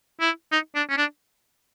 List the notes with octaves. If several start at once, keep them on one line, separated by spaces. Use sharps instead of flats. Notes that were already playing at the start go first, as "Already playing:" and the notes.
E4
D#4
D4
C#4
D4